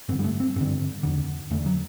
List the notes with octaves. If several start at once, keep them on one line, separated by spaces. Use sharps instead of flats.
G2 D3 C4
G3
A3
C4
G2 D3 C4
E2 D3
E2 D3 A3
F#3